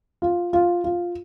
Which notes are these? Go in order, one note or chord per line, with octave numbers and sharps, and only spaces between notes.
F4
F4
F4